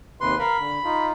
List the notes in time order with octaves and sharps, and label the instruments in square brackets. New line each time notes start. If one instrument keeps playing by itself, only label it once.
[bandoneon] D#2 C3 C6 [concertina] B4
[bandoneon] A#4 F5 [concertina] B5
[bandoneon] D3
D#4 F4